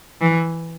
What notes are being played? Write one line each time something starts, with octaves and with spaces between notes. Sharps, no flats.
E3